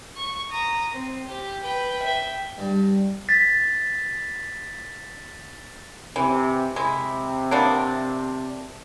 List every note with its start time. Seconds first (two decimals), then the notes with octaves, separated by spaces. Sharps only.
0.17 C#6
0.51 A#5 D#6
0.93 C4
1.28 G4
1.63 B4 G5
2.03 E5 G5
2.58 G2
3.29 A6 B6
6.16 C3 E3
6.76 C3 G#3 E4
7.51 A#3 B3 D4